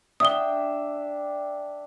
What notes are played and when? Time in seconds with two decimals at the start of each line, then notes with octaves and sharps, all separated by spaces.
0.20 D4 E5 G5 D#6 G7